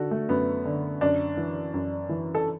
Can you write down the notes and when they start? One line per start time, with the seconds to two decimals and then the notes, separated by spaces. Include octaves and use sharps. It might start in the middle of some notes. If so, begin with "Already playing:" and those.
Already playing: D3 F#4 A4
0.11 A3
0.29 F#2 B3
0.65 D3
1.01 F#2 D4
1.37 E3
1.74 F#2
2.09 E3
2.35 A4